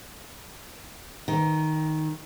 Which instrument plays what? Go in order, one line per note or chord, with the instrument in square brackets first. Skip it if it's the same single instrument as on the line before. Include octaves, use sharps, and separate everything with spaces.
[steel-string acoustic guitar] D#3